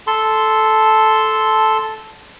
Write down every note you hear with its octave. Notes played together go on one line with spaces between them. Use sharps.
A4 A5 C6